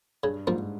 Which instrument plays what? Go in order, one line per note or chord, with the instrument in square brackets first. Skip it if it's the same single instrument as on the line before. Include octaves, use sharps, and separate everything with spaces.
[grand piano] G2 [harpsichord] C#3
[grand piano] G#2 [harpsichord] F3 A#3